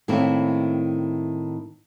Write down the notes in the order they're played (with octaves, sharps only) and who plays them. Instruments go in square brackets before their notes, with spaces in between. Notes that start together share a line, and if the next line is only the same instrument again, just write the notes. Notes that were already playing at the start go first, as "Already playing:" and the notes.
[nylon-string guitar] A2 D#3 A#3 C4 C#4 E4